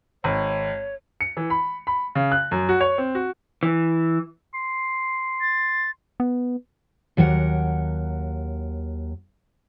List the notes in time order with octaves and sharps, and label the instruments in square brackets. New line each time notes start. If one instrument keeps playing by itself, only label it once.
[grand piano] G#1 [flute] C#5
[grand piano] C#7
E3
B5
B5
C#3
F#6
F#2
F#4
C#5
C4
F#4
[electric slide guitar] E3
[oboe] C6
[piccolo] A6
[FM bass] B3
[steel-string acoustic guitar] D#2 F#3 A#4 C#5 F#5